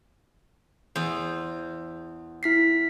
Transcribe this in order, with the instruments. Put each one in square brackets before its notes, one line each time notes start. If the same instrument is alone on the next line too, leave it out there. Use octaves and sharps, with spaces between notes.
[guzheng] E2 C5
[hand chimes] E4 B6 C7